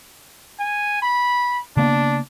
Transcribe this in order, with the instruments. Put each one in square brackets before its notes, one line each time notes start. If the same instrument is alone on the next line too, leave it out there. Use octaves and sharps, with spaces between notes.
[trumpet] G#5
B5
[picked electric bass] C#3 A#3 B3 [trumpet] D4